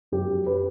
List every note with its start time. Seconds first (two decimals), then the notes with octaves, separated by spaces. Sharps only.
0.12 F#2 G4
0.46 B4